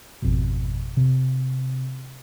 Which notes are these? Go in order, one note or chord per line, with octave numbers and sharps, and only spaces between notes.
G#1 F2 B2
C3